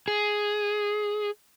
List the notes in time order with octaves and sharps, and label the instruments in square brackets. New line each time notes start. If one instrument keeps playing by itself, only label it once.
[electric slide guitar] G#4